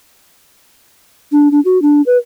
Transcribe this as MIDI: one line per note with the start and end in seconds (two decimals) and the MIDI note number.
1.32 1.48 62
1.51 1.60 62
1.65 1.81 66
1.82 2.01 62
2.06 2.17 71